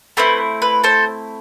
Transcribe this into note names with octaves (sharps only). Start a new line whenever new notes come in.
A3 C4 E4 B4
B4
A4 C5